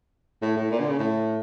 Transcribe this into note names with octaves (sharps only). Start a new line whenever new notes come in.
A2
A2
A#2
D3
C#3
A2